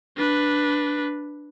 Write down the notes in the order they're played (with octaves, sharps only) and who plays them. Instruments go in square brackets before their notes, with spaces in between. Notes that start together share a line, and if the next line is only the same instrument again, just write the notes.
[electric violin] D4 B4